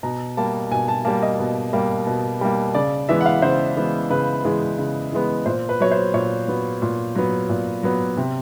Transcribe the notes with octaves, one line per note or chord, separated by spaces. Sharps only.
B2 A#5
G3 A#3 A5
B2 G#5
A5
G3 A#3 A5
D#5
B2
G3 A#3
B2
G3 A#3
C#3 D5
E3 G#3 B3 E5
F#5
F5
C#3 C5
E3 G#3 B3
C#3 B4
E3 G#3 B3
C#3
E3 G#3 B3
A#2 C5
B4
F#3 B3 C#5
C5
A#2 C#5
F#3 B3
A#2
F#3 B3
A#2
F#3 B3
C3